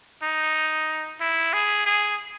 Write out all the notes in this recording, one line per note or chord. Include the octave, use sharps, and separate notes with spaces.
D#4
E4
G#4
G#4